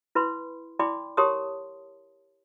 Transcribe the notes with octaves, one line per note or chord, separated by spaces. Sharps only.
E4 B4 B5 C6
E4 D5 G5 B5 C6 D6
G4 A#4 C#5 A5 C6 D#6